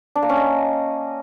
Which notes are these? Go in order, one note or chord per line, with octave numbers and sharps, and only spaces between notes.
D4
A#3
C#4
D#5